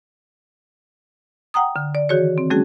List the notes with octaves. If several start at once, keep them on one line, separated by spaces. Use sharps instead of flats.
F#5 G5 A#5 D#6
D3
D5
D#3 E3 F#4 G#4 C#5
C4
G3 A3 C#4 F#4 G#4